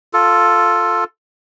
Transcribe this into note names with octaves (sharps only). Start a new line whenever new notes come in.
F4 A4